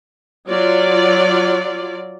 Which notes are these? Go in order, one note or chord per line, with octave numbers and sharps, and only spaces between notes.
F#3 F4 D5